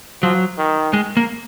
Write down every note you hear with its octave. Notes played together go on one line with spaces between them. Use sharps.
F3 F#3
D#3
G#3
A#3